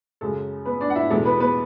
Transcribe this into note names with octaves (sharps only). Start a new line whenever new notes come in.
F#2 C#3 G#3 A4
B3 B4
D4 D5
F#5
E4 E5
E2 B2 G#3 A4
B3 B4
B3 B4